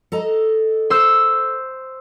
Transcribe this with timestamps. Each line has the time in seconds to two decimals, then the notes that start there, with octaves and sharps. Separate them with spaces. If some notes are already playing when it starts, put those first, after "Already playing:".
0.12 A4 D#5 A#5
0.90 C5 E6